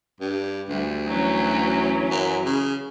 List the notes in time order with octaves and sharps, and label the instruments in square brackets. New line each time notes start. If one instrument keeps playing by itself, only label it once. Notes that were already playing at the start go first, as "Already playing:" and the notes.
[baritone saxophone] G2
[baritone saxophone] D2 [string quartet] G3
[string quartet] E3 F#3 C#4
[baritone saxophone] F#2
C#3